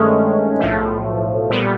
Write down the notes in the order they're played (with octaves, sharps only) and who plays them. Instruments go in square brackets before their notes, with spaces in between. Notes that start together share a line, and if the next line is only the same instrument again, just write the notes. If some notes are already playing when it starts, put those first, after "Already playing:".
Already playing: [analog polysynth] G2 D#3 G#3 C#4 [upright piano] A3
[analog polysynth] B1 A2 F3 A3
A#2 G3 B3